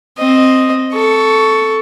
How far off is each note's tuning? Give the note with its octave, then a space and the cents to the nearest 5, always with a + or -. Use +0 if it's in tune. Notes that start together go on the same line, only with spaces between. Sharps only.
C4 +0 D#5 +0
A4 +0 C#6 +10